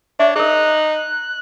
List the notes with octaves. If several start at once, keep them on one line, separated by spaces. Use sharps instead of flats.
D4 C#5 E5
D#4 G#4 A#4 F#6